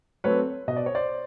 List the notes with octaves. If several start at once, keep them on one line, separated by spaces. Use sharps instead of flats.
F#3 A3 C4 B4 C#5
B2 D#5
D5
C#5
C5 D5